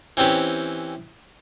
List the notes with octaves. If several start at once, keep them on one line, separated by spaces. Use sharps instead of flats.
E3 C4 C#4 G4 B4